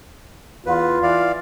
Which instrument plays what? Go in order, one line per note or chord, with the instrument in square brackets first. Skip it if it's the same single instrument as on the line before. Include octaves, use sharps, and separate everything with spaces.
[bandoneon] E2 B4 [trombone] F4
[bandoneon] E3 D5 F5